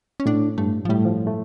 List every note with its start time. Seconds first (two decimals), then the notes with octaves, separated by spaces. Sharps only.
0.20 C#4
0.26 A2 D4
0.58 G2 A3
0.85 F3
0.89 A2 G3
1.05 F3
1.27 A3